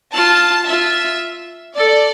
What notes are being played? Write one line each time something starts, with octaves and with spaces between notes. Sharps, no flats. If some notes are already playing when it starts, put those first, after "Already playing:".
F4 A5
F4 E5
A4 D5